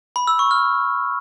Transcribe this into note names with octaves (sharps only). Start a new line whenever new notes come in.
B5
E6
C#6
F6